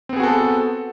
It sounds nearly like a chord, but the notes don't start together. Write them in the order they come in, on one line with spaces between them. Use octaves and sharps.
C4 B3 G#4 F#4 A4